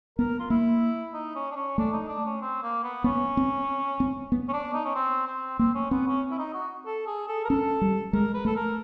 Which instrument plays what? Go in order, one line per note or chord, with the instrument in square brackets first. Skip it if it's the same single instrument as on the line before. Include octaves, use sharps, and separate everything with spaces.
[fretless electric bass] B3 [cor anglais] A#4
[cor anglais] F4
[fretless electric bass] A#3 [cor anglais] E4
[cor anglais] D#4
C#4
D4
C#4
[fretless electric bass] A3 [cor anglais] D4
[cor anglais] D#4
D4
C#4
C4
A#3
B3
[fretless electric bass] B3 [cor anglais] C#4
[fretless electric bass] C4
C4
B3
[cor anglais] C#4
D4
D#4
C#4
C4
C4
[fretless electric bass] A#3 [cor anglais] C4
[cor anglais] C#4
[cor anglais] B3 [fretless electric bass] C4
[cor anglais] C#4
E4
D#4
F#4
A4
G#4
A4
A#4
[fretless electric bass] C#4 [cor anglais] A4
[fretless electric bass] G3
[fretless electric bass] G#3 [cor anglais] A#4
[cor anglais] B4
[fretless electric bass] A3 [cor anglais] A4
[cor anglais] A#4